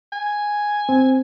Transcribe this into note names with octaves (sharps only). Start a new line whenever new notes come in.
G#5
C4